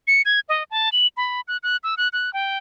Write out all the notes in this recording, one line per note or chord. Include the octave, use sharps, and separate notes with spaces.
C#7
G#6
D#5
A5
F#7
B5
F#6
F#6
E6
F#6
F#6
G5